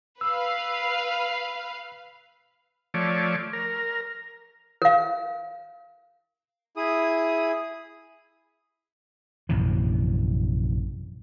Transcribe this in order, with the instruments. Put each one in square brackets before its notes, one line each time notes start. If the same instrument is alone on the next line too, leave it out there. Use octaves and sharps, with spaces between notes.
[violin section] B4 F5 [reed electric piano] E6
[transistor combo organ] F3 A3 C#5 D5
A#4
[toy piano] A#4 F5
[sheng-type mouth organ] E4 G#4 D#6
[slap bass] A#1 F#2 C3 E3